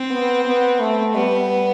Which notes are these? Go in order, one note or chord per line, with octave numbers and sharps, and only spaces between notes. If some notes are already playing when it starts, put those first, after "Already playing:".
Already playing: C4
B3
B3
A3
G3 B3